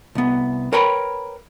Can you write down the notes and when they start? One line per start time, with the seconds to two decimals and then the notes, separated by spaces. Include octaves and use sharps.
0.15 C2 B3
0.73 A#4 B4 C#5 G5 A#5 B5